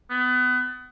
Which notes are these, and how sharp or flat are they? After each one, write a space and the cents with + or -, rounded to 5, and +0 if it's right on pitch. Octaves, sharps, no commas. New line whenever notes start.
B3 +25